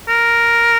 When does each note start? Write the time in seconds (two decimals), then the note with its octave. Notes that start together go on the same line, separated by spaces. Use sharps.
0.08 A#4